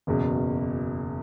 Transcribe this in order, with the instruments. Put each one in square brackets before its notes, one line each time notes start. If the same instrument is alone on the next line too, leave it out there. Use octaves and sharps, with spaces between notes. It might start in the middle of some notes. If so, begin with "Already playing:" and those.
[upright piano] F#1 E2 B2